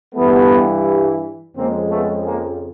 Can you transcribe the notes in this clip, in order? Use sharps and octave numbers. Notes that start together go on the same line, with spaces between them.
G2 E3 G3 A3 B3
F2 C#3 F3 G#3 A#3 C4
A3 B3
G#3 A#3